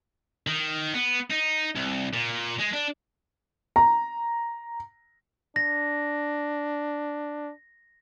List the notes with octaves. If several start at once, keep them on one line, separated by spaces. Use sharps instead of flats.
D#3
B3
D#4
C2
A#2
G#3
D4
A#5
D4 A#6